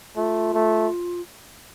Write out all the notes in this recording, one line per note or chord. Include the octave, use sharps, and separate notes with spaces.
A3 F4
A3